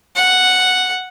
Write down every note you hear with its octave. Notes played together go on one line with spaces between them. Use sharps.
F#5